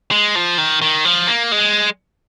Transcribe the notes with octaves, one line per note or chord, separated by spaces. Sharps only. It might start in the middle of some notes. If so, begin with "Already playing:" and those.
G#3
F3
D#3
D#3
F3
A#3
G#3